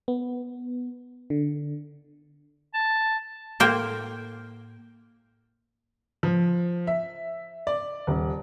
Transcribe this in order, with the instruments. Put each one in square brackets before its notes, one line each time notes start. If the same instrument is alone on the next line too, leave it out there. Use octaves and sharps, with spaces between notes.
[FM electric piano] B3
D3
[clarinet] A5
[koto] A2 A#3 C5 G5
[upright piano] F3
E5
D5
D#1